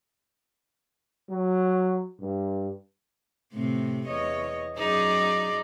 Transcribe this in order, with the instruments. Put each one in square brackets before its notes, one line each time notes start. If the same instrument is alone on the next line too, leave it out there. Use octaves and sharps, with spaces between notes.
[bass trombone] F#3
G2
[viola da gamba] A2 C3 C4
E2 C#5 D#5
[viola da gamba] F#2 G#4 [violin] D#4 D5